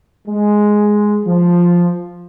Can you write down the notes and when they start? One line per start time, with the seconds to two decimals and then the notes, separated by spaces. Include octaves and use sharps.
0.27 G#3
1.26 F3